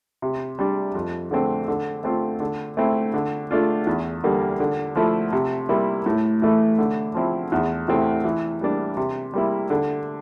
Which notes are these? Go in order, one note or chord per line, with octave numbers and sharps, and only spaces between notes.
C3
G3 D4
F2
D3 A3 C4
D3
A3 C4 F4
D3
A3 C4 E4
D3
A3 D4 F4
E2
D3 G3 A#3
D3
F3 A3 E4
C3
G3 A#3 E4
A2
E3 A3 E4
D3
F3 C4 E4
E2
C3 E3 A3 C4
E3
G3 A#3 D4
C3
G3 A#3 E4
D3